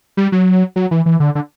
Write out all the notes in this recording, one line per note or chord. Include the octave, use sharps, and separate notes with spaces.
G3
F#3
F#3
E3
E3
D3
D3